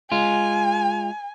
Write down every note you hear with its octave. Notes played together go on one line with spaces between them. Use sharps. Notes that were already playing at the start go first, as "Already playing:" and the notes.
G#3 F4 G#5